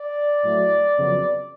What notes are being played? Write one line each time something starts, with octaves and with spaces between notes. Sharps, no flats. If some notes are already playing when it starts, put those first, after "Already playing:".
Already playing: D5
A2 F#3 A3
F2 C#3 F#3 B3